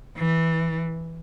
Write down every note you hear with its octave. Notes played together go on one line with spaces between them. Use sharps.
E3